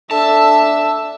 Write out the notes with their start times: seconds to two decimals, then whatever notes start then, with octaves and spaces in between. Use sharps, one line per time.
0.11 D4 A4 E5 A5 E6